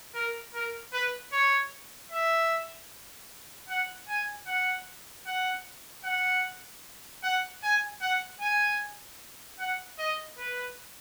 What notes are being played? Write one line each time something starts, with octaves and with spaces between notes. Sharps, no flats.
A#4
A#4
B4
C#5
E5
F#5
G#5
F#5
F#5
F#5
F#5
G#5
F#5
G#5
F#5
D#5
B4